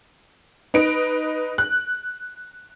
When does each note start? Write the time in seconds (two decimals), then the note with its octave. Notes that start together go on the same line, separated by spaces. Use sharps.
0.74 D#4 B4 D7
1.58 F#6